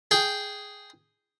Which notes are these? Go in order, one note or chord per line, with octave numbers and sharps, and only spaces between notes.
G#4 G5